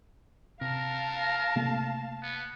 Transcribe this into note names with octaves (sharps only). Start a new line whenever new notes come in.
C3 A#4 F5 A5
C3 A3 A#3
B3